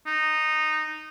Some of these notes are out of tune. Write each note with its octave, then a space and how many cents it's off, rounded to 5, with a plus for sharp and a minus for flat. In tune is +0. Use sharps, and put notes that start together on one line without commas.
D#4 -10